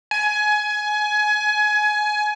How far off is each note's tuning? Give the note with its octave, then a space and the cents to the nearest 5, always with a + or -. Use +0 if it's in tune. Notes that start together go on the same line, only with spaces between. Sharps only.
G#5 +20